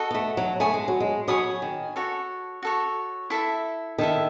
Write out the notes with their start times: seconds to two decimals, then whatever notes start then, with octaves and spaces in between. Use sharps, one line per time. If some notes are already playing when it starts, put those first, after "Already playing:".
Already playing: F#4 A4 D#5 F#5
0.11 B3
0.15 A3
0.37 F#3
0.60 A3 C#5 G#5 B5 D#6
0.74 G#3
0.88 F#3
1.00 G#3
1.28 F#3 C#5 G#5 B5 D#6
1.62 D#3
1.96 F#4 A4 C#5
2.62 F#4 A4 C#5
3.30 E4 A4 E5
3.98 D#3 E4 A4 E5